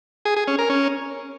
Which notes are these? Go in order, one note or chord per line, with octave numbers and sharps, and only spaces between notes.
G#4
G#4
C#4
A#4
C#4